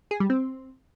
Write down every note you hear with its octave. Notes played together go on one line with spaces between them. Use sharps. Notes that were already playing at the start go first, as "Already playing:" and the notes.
G#4
G3
C4